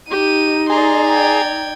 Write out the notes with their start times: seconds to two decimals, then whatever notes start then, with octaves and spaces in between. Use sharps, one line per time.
0.11 D#4 G4 D#7
0.70 G#4 D5 A#5 C6
1.06 G5 G#6